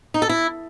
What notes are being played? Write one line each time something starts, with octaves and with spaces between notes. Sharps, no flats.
D#4
A4
E4